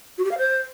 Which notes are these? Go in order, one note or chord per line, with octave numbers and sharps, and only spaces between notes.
F#4
G4
F5
C5